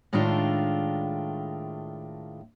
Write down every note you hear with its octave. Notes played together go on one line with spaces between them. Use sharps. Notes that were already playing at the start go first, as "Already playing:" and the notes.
A2 D#3 G#3 A3 D4 F4